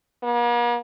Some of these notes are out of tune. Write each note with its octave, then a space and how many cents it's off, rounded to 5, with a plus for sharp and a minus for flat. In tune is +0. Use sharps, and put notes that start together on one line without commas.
A#3 +45